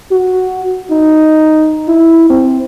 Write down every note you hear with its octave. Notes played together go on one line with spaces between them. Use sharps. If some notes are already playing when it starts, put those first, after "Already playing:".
F#4
D#4
E4
C4